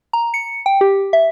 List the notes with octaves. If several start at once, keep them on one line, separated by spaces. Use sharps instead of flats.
A#5
C#7
G5
G4
E5